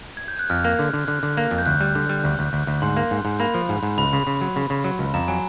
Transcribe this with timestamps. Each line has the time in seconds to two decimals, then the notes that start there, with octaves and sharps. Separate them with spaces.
0.17 G#6
0.28 G6
0.39 F#6
0.50 F2 F6
0.65 A#3
0.79 D3
0.94 D3
1.08 D3 F#6
1.23 D3
1.37 A#3
1.51 F2
1.59 G6
1.66 D2 F#6
1.80 G3
1.95 D3
2.09 G3
2.24 D2
2.39 D2
2.53 D2
2.67 D2
2.82 G#2 C6
2.97 A#3
3.11 G#2
3.25 G#2
3.40 A#3 B5
3.54 F3
3.69 G#2
3.83 G#2
3.98 C#2 B5
4.13 C#3
4.27 C#3
4.41 F#3
4.56 C#3
4.70 C#3
4.84 F#3
4.99 C#2
5.14 F2 A#5
5.28 F#3 G#5